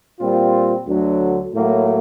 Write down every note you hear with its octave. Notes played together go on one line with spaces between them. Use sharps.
A#2 G3 C4 F4
D2 D3 F#3
A2 F#3 A#3